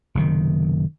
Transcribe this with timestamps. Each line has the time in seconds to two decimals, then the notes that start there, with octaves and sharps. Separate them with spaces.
0.15 F#1 C3 D#3